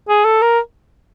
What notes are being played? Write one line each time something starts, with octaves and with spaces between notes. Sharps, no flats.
G#4
A4
A#4